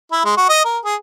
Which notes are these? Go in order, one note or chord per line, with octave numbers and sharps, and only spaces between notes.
E4
G#3
F#4
D#5
A#4
G#4